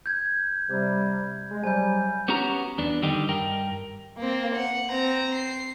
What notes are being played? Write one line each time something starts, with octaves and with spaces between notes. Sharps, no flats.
G6 G#6
C3 G3
G#3
C3 F#3 G3 G#5 G6
B3 C#4 F#4 G4 A#5
E2 B3 D4
D3 D#3 G3 D#4 G4
G2 A#4 G5
A#3 C4
F#5
C4 A#5
C7